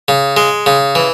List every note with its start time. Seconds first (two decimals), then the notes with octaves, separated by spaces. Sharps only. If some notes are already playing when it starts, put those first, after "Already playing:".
0.08 C#3
0.37 G#3
0.66 C#3
0.95 E3